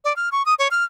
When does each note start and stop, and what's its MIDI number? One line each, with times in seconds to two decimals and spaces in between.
0.04 0.15 74
0.16 0.29 89
0.32 0.45 85
0.46 0.54 87
0.59 0.68 73
0.71 0.84 89